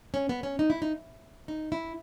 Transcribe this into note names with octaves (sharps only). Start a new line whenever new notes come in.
C#4
B3
C#4
D#4
E4
D#4
D#4
E4